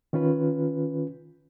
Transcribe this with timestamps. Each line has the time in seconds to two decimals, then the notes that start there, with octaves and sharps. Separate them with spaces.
0.13 D#3 C#4 F4 B4